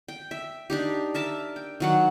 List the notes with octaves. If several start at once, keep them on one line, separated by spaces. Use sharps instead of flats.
G5
E5
D4 D#4 G4
A#4 E5 A5
G5
D#3 F#3 F#5